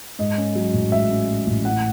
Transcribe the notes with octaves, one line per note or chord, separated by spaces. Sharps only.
G#2 D#5
C#4
F#3
A1
G#2 E5
C#4
F#3
A1
A2 F#5